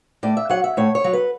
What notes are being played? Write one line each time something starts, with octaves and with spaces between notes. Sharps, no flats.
A2 D5
E5
F#3 F#5
E5
A2 C#5
C#5
F#3
B4